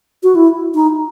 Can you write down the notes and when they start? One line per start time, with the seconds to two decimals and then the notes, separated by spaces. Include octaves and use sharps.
0.23 F#4
0.35 E4
0.75 D#4